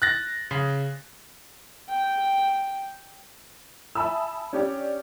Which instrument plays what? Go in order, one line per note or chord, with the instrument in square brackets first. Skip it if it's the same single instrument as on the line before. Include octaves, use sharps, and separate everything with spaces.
[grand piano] F#6 A6 A#6
C#3
[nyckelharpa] G5
[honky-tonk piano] E5 G#5 A5 B5 D#6 E6
C#4 D4 G4 C#5 D5